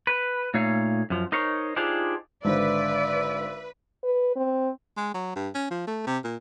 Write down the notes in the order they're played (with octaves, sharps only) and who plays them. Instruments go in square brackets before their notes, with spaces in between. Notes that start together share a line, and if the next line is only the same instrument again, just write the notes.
[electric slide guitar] B4
A#2 A3 D#4 C#5 F5
F#2 F3
D#4 A#4 C5 C#5
D4 D#4 F4 G4 G#4 C5
[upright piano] G#1 D3 C5 [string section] B4 [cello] D5 [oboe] E5
[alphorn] B4
C4
[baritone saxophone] G#3
F#3
G2
C#4
F3
A3
C3
A#2